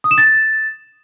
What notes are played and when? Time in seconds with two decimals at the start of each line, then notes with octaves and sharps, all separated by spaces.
0.04 D#6
0.11 E7
0.18 A6